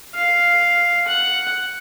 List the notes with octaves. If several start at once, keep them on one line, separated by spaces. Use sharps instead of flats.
F5
F#5